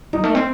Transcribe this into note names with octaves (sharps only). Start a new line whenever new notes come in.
F#3 D#4
A3
C4